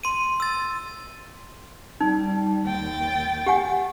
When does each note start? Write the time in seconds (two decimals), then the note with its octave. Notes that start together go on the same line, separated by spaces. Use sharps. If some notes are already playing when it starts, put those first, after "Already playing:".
0.03 C6 D#7
0.40 E6 A6
2.01 G3 D#4
2.66 D#2 G5 A6
3.46 G4 F#5 G#5